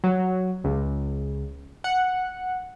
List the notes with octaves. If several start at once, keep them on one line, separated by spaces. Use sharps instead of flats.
F#3
C#2
F#5